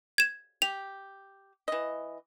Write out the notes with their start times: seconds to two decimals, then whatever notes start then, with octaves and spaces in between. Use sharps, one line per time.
0.18 G#6 E7
0.62 G4 F7
1.68 E3 D#5